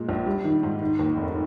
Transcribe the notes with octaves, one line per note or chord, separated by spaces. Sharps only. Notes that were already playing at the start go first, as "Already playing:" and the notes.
Already playing: A#2 G#3
A#1
G3
D#3
G#2
D#3
D#2
F1